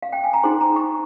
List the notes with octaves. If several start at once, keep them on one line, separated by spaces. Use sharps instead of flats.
F5
G5
G#5
A#5
D#4 G#4 C5 C6
A#5
C#6